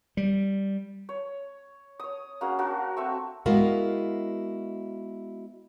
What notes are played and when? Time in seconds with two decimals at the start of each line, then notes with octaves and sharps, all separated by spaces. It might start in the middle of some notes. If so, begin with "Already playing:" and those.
0.17 G3
1.09 C#5
2.00 C#5 D#6
2.41 A#3 C#4 F#4 G#4
2.59 A#3 D4 F#4 A#4
2.97 A3 C4 E5 C#6
3.46 G#3 B3 E4 F#4 A#4 F5